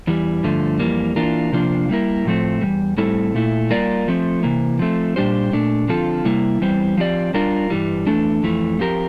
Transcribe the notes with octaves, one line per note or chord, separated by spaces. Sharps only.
E2 E3 G3
G2 D3 F3 A3
F2 E3 G3 A#3
E3 A#3 D4 F4 A#4
C3 F3 A#3 D4 F4
G3 A#3 E4 A#4
A2 F3 A3 C4
E2 C3 G3
A2 G3 C4 E4 A4
A#2 A3 E4
G3 A#3 F4 A#4 D5
F3 A3 C4
C3 E3 A#3
F3 A3 C4
A#2 G3 D4 G4 C5
A#2 A3 D4
D3 F3 C4 F4 A4
C3 G3 A#3 E4
E2 E3 G3 C4
F3 C4 G4 A#4 D5
G3 D4 F4 A#4
G2 E3 G3
E2 E3 A3 D4 A4
F2 E3 A3
F3 C4 G4 A#4